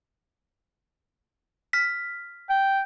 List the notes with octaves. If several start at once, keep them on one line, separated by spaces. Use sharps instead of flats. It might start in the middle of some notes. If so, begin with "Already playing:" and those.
F6 B6
G5